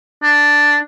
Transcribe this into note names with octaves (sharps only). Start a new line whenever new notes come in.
D4